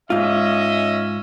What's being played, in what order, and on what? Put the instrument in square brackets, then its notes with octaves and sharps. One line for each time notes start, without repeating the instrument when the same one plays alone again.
[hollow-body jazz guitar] G#2 F4 [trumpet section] C#4 D#5 E5